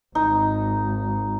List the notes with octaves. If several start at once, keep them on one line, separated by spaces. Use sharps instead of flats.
G#1 D#4